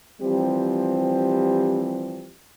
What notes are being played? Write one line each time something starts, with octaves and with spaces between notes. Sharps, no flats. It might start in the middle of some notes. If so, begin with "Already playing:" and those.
E3 F3 G3 C4 G4